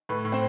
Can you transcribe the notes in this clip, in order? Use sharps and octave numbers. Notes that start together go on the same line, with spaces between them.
A2 B4
A2
C4 C5